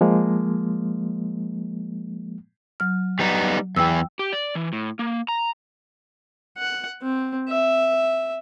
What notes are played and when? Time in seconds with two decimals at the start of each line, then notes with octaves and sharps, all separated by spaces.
0.01 F3 G#3 A#3
2.80 F#3 F6
3.19 G3 B3 D#4
3.76 E2 E3 G5 E6
4.19 G4
4.33 D5
4.55 E3
4.73 A2
4.99 A#3
5.28 A#5
6.58 F#5
7.02 C4
7.49 E5